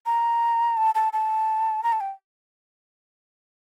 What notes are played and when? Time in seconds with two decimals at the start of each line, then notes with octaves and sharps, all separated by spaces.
0.06 A#5
0.77 A5
0.95 A5
1.13 A5
1.83 A#5
1.92 A5
2.01 G5